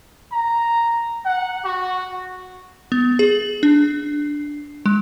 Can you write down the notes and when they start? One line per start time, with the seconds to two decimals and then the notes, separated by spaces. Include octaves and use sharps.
0.32 A#5
1.25 F#5
1.65 F#4
2.92 B3
3.19 G#4
3.63 D4
4.86 G#3